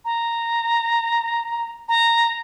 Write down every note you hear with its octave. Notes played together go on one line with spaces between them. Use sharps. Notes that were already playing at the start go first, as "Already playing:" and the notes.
A#5
A#5